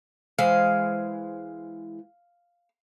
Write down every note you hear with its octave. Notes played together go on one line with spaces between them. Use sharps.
E3 G#3 C5 F5